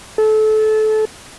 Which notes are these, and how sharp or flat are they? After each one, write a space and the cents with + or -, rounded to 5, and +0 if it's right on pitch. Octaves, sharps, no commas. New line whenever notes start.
A4 -25